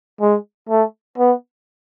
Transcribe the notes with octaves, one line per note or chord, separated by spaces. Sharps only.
G#3
A3
B3